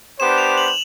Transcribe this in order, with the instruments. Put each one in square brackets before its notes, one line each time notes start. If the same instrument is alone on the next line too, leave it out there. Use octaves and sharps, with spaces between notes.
[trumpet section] B3 D4 G4 C5 [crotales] E7
[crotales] F7
F#7
F#7